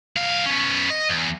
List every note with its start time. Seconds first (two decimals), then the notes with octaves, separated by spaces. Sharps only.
0.16 C2 F5
0.46 B3 C#4
0.90 D#5
1.09 E2